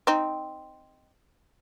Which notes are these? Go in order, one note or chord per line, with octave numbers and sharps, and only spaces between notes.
C4 D#4